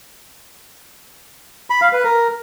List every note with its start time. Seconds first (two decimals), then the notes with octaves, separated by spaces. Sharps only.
1.70 B5
1.81 F5
1.93 B4
2.04 A#4